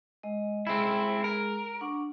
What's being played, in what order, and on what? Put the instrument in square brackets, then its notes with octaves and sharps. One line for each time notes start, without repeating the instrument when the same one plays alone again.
[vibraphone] G#3 D#5
[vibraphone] G#3 G#4 [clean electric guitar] C4 E4
[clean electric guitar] A#4
[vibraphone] D4 F#5 C#6